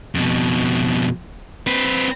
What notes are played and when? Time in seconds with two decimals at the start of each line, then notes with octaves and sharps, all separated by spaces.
0.15 F2 B2
1.67 C4 B4